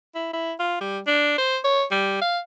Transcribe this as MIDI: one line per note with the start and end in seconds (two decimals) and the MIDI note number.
0.15 0.30 64
0.33 0.53 64
0.59 0.80 65
0.80 0.99 55
1.07 1.36 62
1.38 1.59 72
1.64 1.85 73
1.91 2.20 55
2.22 2.39 77